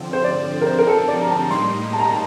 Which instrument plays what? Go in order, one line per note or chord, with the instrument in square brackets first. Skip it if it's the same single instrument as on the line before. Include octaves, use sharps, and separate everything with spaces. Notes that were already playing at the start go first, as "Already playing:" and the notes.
Already playing: [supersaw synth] D3 F3 C4
[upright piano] C5
D5
A#4
C5
A#4
A4
D5
A#5
A5
[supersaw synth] A2 G3 A#3 D#4 [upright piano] C6
[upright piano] A5
A#5
A5